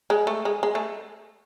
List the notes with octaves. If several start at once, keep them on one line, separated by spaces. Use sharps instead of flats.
G#3
A3
G#3
G#3
A3